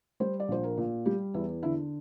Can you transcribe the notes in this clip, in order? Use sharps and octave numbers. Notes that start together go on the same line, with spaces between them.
G3 C5
D5
A#1 C5
A#4
A#2
G3 G4
E2 E4
D3 E4